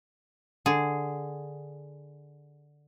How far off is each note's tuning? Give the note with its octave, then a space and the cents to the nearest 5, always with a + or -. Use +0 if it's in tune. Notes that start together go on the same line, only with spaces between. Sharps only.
D3 +0 G#4 +0